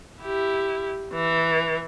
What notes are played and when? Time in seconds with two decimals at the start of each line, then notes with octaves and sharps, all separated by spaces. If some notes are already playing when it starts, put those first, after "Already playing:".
0.22 E4 G4
1.14 E3